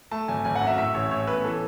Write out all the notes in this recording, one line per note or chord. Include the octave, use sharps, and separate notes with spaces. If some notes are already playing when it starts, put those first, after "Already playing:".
A3 A5
G#1 G#5
G#1 G#5
F#5
F#2
E5
A2 E5
A1 C#5
A2 C#5
B3 B4
E3 A4